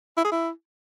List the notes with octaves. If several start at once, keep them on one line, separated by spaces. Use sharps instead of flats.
E4
G#4
E4